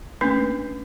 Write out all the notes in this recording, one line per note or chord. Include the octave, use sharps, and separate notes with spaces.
A3 A#3 C#4 D4 B4